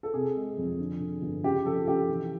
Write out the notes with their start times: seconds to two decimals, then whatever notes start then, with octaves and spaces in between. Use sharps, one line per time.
0.03 A4
0.14 C3 G#4
0.36 G#3
0.58 F2
0.79 D3
1.00 D3
1.22 G1
1.43 C#3 G4
1.66 F3 A4
1.87 C#3 G4
2.09 E3